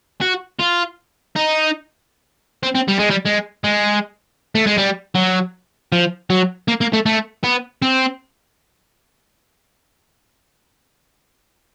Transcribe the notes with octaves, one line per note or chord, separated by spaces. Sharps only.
F#4
F4
D#4
C4
C4
G3
G#3
G3
G#3
G#3
A3
G#3
G3
F#3
F3
F#3
A#3
A#3
A3
A3
B3
C4